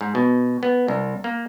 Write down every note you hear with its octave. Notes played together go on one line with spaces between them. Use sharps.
G#2
B2
B3
C2
A#3